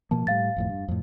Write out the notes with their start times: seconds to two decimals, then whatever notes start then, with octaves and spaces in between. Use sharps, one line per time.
0.11 B2 F3 A#3 A5
0.27 A2 G3 F5 A6
0.56 G#1 F2 A2
0.69 G2
0.88 F2 A2